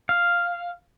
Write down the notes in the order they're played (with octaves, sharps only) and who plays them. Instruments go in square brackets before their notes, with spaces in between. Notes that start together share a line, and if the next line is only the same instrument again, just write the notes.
[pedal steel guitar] F5